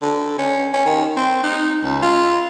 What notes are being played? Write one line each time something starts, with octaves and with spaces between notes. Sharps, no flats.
D3
C#4
C#4
D#3
C4
D#4
C#2
F4